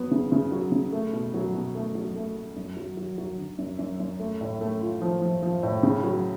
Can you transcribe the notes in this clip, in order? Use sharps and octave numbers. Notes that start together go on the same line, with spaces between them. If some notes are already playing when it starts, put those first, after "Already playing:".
Already playing: F#3 B3
C#3
C#3
F#3
C#3
A3
B2
F#3
B2
A3
F#3
A3
A3
F#2
F#3
F#3
F#3
D3
F#2
F#2
F#2
A3
A2
A3
F4
F3
F3
F3
A2
C#3
F#3